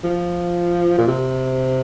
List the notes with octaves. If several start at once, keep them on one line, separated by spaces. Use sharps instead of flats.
F3
A#2
C3